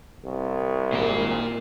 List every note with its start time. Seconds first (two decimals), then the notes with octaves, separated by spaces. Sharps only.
0.25 C2
0.93 G#1 A#2 A#4